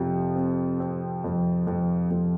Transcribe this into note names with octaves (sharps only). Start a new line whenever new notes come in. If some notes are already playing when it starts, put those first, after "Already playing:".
Already playing: F2 C3 F3
C4
C4
F2
F2
F2